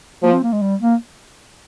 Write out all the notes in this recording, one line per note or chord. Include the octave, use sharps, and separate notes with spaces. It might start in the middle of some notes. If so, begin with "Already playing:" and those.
F3 A#3
C4
A#3
G#3
G3
A#3